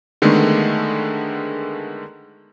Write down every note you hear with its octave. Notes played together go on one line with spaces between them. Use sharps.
D3 D#3 G#3 A3 B3